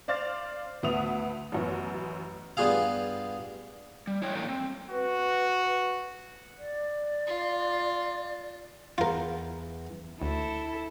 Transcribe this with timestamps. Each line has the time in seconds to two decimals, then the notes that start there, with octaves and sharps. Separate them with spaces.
0.08 C5 D5 F5 F6 A6
0.83 D2 B3 E5 D#6 F7
1.52 A1 F#2 B3
2.57 G2 B3 F4 G#4 F5
4.07 G3
4.22 E4 C#5 D#5 G5
4.35 A2 E3 A#3 A4 G5 A#5
4.49 C4
4.90 F#4 B4
6.58 D5
7.27 F4
8.98 E2 F4 A#4
10.22 D2 E4 A4